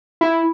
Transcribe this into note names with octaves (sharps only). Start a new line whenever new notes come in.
E4